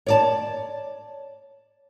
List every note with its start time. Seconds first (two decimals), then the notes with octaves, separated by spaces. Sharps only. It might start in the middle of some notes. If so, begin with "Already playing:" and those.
0.06 C#5 D5 A5